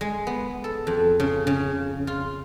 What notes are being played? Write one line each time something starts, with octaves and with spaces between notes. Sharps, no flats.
G#3
B3
A4
F2
C#3
C#3
F4